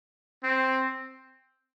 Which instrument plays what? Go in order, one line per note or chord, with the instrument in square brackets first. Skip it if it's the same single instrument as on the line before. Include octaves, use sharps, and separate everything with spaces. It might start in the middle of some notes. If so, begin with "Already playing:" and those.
[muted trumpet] C4